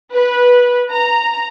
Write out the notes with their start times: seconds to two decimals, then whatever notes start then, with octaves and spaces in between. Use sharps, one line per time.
0.12 B4
0.93 A#5